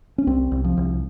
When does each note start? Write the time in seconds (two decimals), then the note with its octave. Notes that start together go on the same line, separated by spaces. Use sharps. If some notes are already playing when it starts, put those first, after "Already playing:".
0.18 C#4
0.27 C2 C4
0.52 C2
0.64 F3
0.77 C2